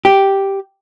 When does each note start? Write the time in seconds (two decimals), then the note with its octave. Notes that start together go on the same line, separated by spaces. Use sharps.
0.05 G4